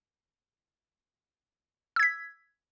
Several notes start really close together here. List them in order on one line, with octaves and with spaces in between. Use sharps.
E6 G#6 B6